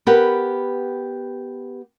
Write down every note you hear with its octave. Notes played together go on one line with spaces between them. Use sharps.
B3 G4 A#4 B4 F#5